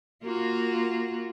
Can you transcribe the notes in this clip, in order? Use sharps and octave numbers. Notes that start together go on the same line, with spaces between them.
A#3 F4 F#4